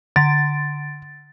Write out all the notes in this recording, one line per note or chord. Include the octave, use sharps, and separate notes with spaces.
D3 A6 D7